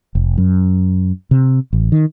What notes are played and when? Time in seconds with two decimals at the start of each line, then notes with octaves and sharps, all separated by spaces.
0.15 F1
0.38 F#2
1.31 C3
1.73 A1
1.92 D#3